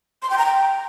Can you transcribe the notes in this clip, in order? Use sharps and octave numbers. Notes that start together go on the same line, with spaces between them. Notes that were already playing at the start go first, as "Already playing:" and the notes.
C6
G5
A#5
G5